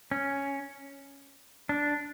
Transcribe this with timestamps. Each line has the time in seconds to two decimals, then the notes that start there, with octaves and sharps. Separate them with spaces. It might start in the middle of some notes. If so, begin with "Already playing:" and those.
0.11 C#4
1.69 D4